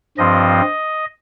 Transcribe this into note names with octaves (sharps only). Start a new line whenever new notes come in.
G2 F3 C4 D#5